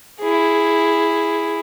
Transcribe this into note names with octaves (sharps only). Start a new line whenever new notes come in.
E4 G#4